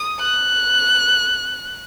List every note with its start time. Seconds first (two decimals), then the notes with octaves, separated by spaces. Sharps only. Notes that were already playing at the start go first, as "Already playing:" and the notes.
Already playing: D#6
0.20 F#6